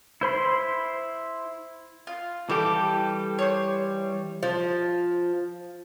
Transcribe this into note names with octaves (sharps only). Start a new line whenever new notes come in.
E4 C5 B5 C6
F4
E3 G3 G4 A4
C5 C#5
F3